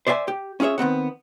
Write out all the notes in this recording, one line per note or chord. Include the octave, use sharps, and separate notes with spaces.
C5 D5 E5 G5 G#5
G4
C#4 F4 G#4 C#5 E5
D#3 B3 C4 F#5